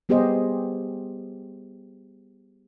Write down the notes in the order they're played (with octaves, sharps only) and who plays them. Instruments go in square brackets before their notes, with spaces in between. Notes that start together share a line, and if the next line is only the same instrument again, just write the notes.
[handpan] G3 B3 G4 G#4 C5 D#5